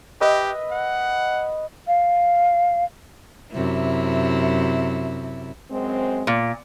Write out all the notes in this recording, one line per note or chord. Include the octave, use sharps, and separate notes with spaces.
G4 B4 D#5 E5
F#5
F5
F#2 C3 E4
F#2 G#3 C4
A#2